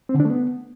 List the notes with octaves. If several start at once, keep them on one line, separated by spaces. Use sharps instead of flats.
C4
D3
D4
A3
B3